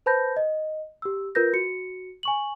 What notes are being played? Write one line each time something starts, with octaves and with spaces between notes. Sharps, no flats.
B4 C5 A5 B5 G6 A#6
D#5
G4 E6
F4 A#4 B4 G6 A#6
F#4 C#7
G#5 C#6 F#7